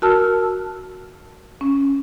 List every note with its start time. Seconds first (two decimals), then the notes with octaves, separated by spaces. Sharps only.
0.02 F#4 A#4 A5 E6 F6
1.61 C#4